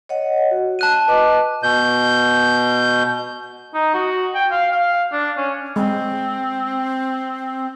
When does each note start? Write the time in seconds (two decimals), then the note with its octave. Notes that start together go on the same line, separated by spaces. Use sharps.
0.09 C#5 D#5 F#5
0.51 F#4
0.79 A5 F#6 D#7
1.08 B4 D#5 D6
1.63 B2 G6
3.74 D#4
3.94 F#4
4.34 G5
4.51 F5
4.72 F5
5.12 D4
5.37 C#4
5.76 G#3 C4